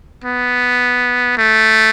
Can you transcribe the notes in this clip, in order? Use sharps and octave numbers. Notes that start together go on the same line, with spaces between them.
B3
A3